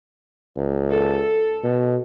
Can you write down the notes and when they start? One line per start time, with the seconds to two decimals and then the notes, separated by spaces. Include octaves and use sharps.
0.57 C#2
0.89 A4
1.64 B2